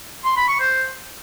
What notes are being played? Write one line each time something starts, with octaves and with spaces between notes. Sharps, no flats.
C6
B5
C#6
C5